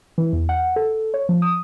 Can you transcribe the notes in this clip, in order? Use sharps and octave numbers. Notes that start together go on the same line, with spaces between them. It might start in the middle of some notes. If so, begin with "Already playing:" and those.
E3
E2
F#5
A4
C#5
F3
D#6